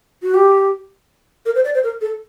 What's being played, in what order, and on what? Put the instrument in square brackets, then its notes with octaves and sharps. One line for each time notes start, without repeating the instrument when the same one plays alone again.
[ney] F#4
G4
A#4
C5
D5
C5
A#4
A4